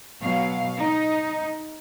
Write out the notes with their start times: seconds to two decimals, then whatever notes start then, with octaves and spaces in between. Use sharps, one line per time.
0.20 B2 F#3 F5
0.81 D#4